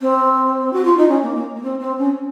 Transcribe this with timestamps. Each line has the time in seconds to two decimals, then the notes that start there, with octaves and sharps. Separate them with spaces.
0.01 C4
0.73 F#4
0.85 F4
0.97 D#4
1.08 C#4
1.22 A#3
1.35 A#3
1.54 A#3
1.63 C4
1.80 C4
1.98 C#4